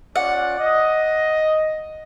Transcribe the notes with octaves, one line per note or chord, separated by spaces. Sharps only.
C#4 F4 D5 F#5
D#5